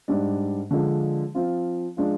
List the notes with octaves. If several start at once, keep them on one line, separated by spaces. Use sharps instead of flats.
G#2 G3 D4
D3 F3 G#3 D4
F3 C4 F4
F3 G#3 D4 F4